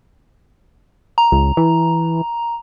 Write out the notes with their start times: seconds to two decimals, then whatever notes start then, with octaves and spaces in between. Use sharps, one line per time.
1.18 A#5
1.32 C#2
1.57 E3